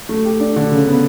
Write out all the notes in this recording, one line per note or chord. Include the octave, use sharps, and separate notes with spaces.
A3
G4
D4
D3
C#3
B3